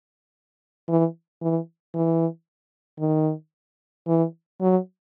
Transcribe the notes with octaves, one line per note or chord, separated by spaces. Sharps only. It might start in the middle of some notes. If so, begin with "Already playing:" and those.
E3
E3
E3
D#3
E3
F#3